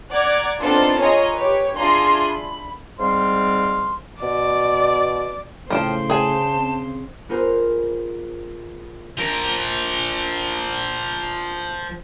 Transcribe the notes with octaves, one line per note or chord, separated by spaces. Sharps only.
D5 F#5 A#5 F#6 G#6
B3 C4 D4 D#4 F4 A4
F4 G#4 C#5 D#5 G#5 A#5
G4 B4 C#5
D4 F4 G#4 E5 A#5 C6
B5
G#2 G3 C4 F5 C6
B2 D5
A2 C#3 F3 C5 G5 A5
G#4 G#5 A5
C4
B3 F4 G#4 A#4 C5
F3 A#4